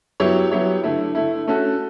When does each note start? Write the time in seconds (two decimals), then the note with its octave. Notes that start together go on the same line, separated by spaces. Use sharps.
0.20 F#3 B3 E4 G4 C#5
0.51 F#3 B3 E4 G4 C#5
0.84 D3 A3 E4
1.15 D3 A3 E4
1.48 A3 C#4 F#4 A4